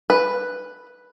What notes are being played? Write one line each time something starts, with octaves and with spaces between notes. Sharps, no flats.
B4